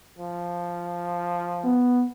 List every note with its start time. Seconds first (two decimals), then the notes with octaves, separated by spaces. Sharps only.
0.19 F3
1.64 B3